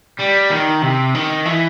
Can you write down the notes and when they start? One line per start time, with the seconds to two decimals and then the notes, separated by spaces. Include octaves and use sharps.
0.19 G3
0.50 D#3
0.82 C3
1.15 D#3
1.46 E3